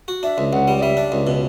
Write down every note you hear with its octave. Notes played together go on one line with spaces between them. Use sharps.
F#4
D4 E5
C#2
C#2 F#5
G3
D5
G3 E5
D4
C#2
B2